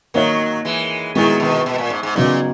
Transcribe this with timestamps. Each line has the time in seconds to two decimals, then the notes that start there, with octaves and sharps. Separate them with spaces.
0.14 D#3 F#3 A#3 D#4 A#4 C#5
0.65 E3 G#3
1.15 D#3 F#3 G#3 B3 E4 G#4
1.40 B2 D#3
1.66 B2
1.78 A#2
1.90 G#2
2.03 G#2
2.15 A#2 C#3 F#3 B3 D#4